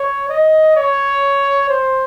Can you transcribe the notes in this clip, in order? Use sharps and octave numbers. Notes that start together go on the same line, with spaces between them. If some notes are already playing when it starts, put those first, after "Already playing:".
Already playing: C#5
D#5
C#5
C5